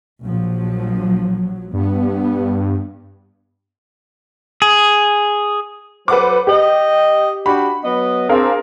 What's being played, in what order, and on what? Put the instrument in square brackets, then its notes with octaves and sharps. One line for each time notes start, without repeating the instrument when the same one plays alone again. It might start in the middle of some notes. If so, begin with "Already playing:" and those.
[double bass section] A#1 F3 F#3
[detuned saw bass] G2 [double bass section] B3
[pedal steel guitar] G#4
[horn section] F#3 A4 C5 [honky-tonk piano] B4 F#5 D6
[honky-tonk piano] G4 [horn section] D#5 G5
[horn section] D4 F#4 G4 [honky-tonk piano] B5
[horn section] F#3 B3 D#5
[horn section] C4 D4 [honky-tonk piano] G#4 A#4 F5